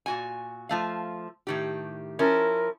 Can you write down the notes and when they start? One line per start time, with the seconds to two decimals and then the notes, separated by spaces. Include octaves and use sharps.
0.06 A#2 F#4 G#5
0.69 F3 A3 F5
1.47 A2 D#3 G4
2.19 F3 C#4 E4 A#4